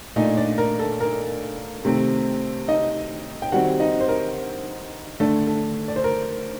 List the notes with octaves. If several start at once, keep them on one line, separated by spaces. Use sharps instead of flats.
A#2 A3 D4 D#4 D#5
D4 D5
A#4
A4
A#4
C3 D#3 A3 C4
D#4 D#5
G5
D#3 G3 C4 F#4 F#5
D#4 D#5
C5
A#4
D3 A3 D4 A4
A4
D5
C5
A#4